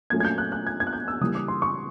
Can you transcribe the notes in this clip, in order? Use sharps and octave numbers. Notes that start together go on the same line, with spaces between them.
A#2 F#3 A3 C#4 G#6
G#6
G6
F#6
F#6
G#6
G#6
F#6
G6
E6
C#3 E3 G3 A#3 D#6
D6
C6
C#6